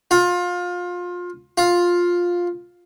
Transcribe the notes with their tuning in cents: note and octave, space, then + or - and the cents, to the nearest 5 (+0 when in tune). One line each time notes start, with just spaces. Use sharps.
F4 +25
F4 +10